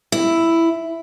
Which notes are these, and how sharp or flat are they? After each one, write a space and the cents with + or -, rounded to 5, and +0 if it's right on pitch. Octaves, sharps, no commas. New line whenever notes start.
E4 +5